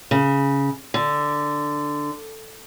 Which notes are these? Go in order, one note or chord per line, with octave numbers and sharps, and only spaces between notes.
C#3
D3